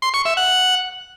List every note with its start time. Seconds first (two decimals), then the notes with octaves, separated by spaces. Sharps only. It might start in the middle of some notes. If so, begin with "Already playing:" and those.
0.02 C6
0.14 C#6
0.25 E5
0.37 F#5